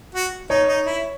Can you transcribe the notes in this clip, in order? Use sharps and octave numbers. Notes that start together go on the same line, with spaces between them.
F#4
D#4 C#5
D#4
E4